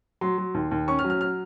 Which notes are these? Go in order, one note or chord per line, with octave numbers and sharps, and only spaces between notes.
F#3 C6
F#3
D#2
D#2
C#4 C#6
F6
F#3
F6
F6